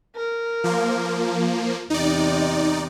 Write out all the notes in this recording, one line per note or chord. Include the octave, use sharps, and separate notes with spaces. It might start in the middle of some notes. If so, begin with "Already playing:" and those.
A#4
F3 A#3
E2 C3 D#4 D5